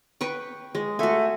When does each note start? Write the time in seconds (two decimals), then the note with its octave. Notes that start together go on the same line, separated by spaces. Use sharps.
0.21 B4 G5 C#6
0.75 G#3
0.99 A3 F#4 G#5